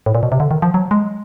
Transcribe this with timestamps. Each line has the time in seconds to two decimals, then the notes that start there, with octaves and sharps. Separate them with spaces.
0.06 A2
0.15 A#2
0.23 B2
0.32 C3
0.40 D3
0.51 D#3
0.62 F3
0.74 F#3
0.91 G#3